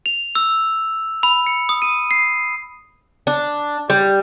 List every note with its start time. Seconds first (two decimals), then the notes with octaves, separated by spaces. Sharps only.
0.06 F7
0.35 E6
1.23 B5
1.47 C#7
1.69 D#6
1.82 D#7
2.11 C7
3.27 D4
3.90 G3